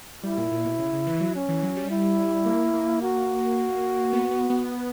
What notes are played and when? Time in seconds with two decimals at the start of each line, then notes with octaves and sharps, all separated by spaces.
0.23 G3 E4
0.38 A#2
0.52 A#2
0.65 B2
0.79 C#3
0.93 C#3
1.07 E3
1.21 F#3
1.35 C#4
1.49 E3
1.63 F#3
1.77 G3
1.90 E4
2.45 A#3
2.74 A#3
3.02 F#4
4.13 B3
4.31 B3
4.50 B3